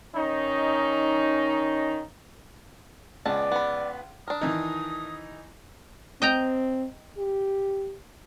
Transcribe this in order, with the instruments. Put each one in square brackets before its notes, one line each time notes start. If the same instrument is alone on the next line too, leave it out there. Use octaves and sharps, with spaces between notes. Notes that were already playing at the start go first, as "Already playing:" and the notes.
[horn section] D#3 C#4 D#4
[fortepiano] C#2 [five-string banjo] G#3 B3 A5 [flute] D5
[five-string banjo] B3 B5
[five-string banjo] D4 A#4 [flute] D#6
[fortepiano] D#3 E3 D#4
[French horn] C4 [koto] D#5 G5 A#5
[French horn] G4